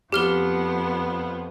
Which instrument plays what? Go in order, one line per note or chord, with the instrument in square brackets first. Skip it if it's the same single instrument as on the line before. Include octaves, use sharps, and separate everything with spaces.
[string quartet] F2 F3 B3 [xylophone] G4 F6 G7